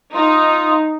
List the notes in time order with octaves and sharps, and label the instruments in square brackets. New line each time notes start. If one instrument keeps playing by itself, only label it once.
[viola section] D#4 [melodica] F4